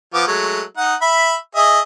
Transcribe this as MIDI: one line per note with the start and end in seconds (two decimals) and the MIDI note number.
0.14 0.26 53
0.14 0.26 59
0.14 0.26 86
0.27 0.61 54
0.27 0.61 56
0.27 0.61 57
0.77 0.94 63
0.77 0.94 78
1.01 1.34 76
1.01 1.34 83
1.55 1.80 68
1.55 1.80 75
1.55 1.80 76